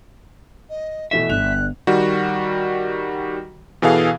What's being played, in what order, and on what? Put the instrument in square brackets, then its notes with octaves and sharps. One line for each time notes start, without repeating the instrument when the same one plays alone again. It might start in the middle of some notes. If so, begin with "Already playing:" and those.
[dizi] D#5
[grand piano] B2 E3 A3 [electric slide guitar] E5
[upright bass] G1 [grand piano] D4 F7 [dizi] F#6
[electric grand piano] D#3 G3 F#4
B2 E3 G#4 A4 F5